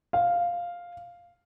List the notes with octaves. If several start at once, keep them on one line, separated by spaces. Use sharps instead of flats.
F5